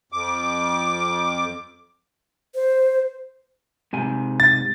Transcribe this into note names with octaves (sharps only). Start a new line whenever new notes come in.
F2 D6
C5
G#2 C3 G#5
A6